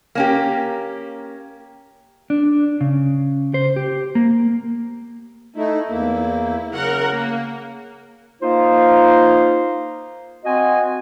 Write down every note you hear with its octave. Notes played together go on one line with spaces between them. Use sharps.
A#3 C#4 G4
D4
C#3
C5
G4
A#3
A3 D#4 E4
E2 A#3 E4
C#3 F#3 A#4 F#5
A#3
A#3 D#4 F4 C5
C4 F#4 D#5 G#5